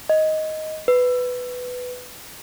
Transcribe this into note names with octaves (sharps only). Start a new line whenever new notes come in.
D#5
B4